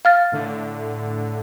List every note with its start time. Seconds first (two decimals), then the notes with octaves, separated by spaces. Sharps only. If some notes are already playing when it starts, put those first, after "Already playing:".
0.05 F5 F6 A6
0.32 A2 D3